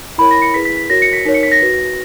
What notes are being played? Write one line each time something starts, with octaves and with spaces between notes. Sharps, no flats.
E4 A#4 C#5 B5
A#6
C#7
E4 G#4 B4 B6
B6
B6
F#4 A#4 C#5 A#6
C#7
B6
D#4 A#4 C#5 B6
C#7
B6
A#6
F#4 B4